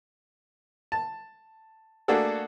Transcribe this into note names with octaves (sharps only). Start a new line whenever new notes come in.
A5
A3 A#3 D4 F#4 G#4 A4